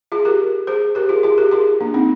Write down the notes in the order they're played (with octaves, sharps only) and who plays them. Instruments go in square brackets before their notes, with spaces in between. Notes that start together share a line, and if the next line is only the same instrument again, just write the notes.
[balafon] F4 G#4
G4 A#4
G#4 C5
G4 A#4
F4 G#4
F4 G#4
G4 A#4
F4 G#4
A#3 D4
C4 D#4